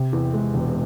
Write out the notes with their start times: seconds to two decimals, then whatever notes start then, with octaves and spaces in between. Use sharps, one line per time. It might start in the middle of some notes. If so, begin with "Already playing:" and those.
Already playing: C3
0.13 E2
0.33 G#3
0.54 E1